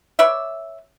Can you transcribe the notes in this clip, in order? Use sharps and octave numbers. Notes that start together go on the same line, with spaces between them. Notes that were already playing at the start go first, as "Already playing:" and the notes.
B4 C#5 D5 E5